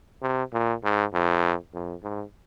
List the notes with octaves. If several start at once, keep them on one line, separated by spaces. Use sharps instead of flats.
C3
A#2
G#2
F2
F2
G#2